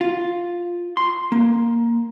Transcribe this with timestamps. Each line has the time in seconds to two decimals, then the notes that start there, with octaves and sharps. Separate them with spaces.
0.01 F4
0.97 C6
1.32 A#3